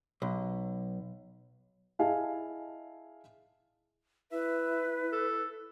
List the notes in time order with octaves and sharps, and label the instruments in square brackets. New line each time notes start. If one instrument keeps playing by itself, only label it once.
[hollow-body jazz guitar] B1
[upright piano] E4 G#4 D#5 F5 G#5 A5
[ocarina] E4 [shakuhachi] B4 [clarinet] E5
[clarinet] A4